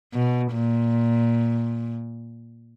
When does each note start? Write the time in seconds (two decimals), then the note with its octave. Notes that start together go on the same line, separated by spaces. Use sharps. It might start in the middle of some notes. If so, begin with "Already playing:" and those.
0.13 B2
0.53 A#2